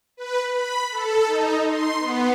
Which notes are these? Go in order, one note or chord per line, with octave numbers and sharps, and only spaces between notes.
B4
B5
A4
D#4
C6
B3